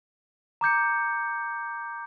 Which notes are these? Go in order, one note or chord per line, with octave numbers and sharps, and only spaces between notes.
A#5 D6 G6 C#7